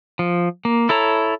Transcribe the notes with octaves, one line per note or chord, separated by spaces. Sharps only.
F3
A#3
E4 A4 C#5 A#5